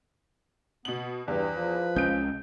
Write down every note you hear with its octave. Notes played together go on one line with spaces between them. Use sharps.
B2 B3 F#7
E2 G2 B4
F3
C2 G#3 C#4 G6 D7